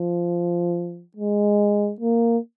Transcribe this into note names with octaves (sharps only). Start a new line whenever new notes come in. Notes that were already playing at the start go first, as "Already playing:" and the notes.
Already playing: F3
G#3
A#3